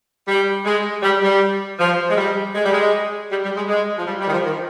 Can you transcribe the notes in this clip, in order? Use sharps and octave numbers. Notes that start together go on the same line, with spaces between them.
G3
G#3
G3
G3
F3
G#3
G3
G#3
G3
G#3
G3
G3
G#3
G#3
F3
G3
G3
D#3
F3
D#3